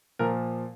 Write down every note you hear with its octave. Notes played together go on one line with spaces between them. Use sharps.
A#2 F3 A#4